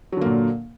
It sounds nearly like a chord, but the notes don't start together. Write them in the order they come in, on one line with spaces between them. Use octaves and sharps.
F#3 D3 A#3 A#2